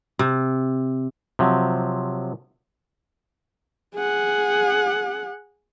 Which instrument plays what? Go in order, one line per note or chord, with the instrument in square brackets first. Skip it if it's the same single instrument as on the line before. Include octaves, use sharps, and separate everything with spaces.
[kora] C3
[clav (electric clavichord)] C3 F3 F#3
[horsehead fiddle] G#4 F#5